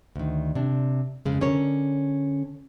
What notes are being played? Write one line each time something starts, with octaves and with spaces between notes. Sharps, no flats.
D2 D#3
C3 D4
F2 C#3 G#3
D3 C#4 A#4 C#5